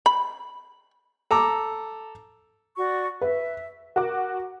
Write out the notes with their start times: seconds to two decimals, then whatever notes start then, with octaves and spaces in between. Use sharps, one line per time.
0.06 B5
1.31 A4 A#5 D6
2.77 F#4 D5 C#6
3.21 B4 E5
3.96 F#4 A#4 D6